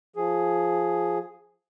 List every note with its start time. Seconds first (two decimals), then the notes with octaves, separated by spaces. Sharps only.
0.16 F3 G#4